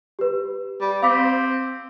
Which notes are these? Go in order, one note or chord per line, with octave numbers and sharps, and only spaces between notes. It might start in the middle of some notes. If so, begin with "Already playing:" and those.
G4 B4
G3
C4 F5 D6 B6